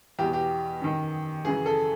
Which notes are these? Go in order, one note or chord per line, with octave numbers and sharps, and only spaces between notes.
E2 B2 G4
G4
F#2 D#3
F#2 C#3 E3 G#4
A4